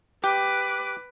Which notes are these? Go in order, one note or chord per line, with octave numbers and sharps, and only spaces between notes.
G4 B4 D6